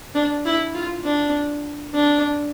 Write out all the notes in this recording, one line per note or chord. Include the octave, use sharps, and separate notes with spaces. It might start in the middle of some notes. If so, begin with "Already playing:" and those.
D4
E4
F4
D4
D4